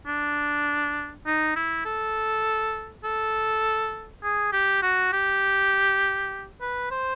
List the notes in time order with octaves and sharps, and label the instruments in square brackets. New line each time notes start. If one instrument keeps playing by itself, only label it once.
[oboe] D4
D#4
E4
A4
A4
G#4
G4
F#4
G4
B4
C5